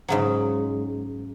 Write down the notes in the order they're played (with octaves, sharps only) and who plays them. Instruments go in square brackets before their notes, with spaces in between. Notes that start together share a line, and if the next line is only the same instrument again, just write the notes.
[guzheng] G#2 C#3 F#3